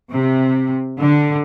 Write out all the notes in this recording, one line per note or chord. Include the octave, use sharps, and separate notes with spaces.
C3
D3